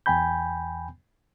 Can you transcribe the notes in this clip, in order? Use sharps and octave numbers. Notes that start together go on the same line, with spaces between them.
E2 G5 G#5 B5 G6